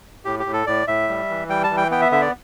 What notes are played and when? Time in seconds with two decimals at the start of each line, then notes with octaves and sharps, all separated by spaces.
0.25 A2 G4
0.39 G4
0.46 A2
0.53 A4
0.67 A2 D5
0.87 A2 E5
1.09 G3
1.29 E3
1.49 G3 G5
1.64 A5
1.70 E3
1.77 G5
1.91 B3 G5
2.01 E5
2.11 D3 E5
2.22 D5